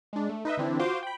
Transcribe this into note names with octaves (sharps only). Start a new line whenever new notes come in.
G#3 D4
A3
D#4 B4 D#5 E5
D3 E3 C4 D4 E4
F4 F#4 C5 C6 D6
G5 B5